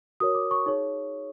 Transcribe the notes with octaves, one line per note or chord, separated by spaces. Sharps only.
F#4 A#4 C#5 D#6
D6
C#6
D#4 G#4 C#5